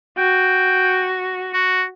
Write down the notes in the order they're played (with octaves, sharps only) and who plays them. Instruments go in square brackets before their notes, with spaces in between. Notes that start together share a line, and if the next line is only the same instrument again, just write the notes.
[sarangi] F#4 [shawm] G5
[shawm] F#4